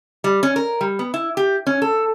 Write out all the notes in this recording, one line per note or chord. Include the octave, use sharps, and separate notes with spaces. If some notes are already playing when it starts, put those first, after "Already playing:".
G3
C#4
A#4
G3
B3
E4
G4
C#4
A4